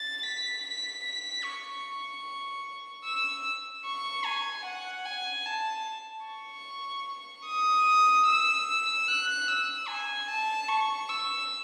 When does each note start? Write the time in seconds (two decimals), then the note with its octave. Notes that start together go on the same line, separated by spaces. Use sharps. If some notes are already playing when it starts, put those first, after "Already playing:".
Already playing: A6
0.23 B6
0.63 B6
1.04 B6
1.44 C#6
3.05 E6
3.85 C#6
4.25 G#5
4.66 F#5
5.05 G#5
5.46 A5
6.26 C#6
7.47 D#6
8.27 E6
9.08 F#6
9.48 E6
9.88 G#5
10.28 A5
10.68 C#6
11.09 E6